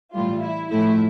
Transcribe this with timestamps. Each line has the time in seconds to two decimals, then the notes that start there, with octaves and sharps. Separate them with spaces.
0.14 A2 E3 G3 F4
0.42 E4
0.71 A2 F3 A3 E4